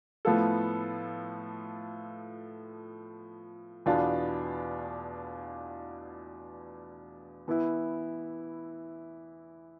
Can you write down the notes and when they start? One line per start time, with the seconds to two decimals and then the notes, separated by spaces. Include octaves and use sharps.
0.25 A2 F3 B3 F4 A4
3.86 E2 B2 B3 D4 F4
7.48 E3 B3 E4